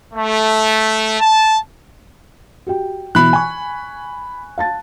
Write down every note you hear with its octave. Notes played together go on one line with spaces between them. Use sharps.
A3
A5
F#4 G4 G5
B2 E3 B5 F#6
G#5 C#6
F5 A5 A6